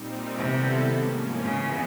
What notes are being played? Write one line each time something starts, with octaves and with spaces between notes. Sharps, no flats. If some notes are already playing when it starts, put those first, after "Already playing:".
Already playing: A#2 G3 C4 D#4
C3 D#3 G3 B3 E4 A4
G#2 F3 A#3 C#4
C#3 E3 G#3 B3